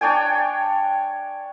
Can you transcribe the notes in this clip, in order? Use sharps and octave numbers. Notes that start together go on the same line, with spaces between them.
D4 C#5 G5 G#5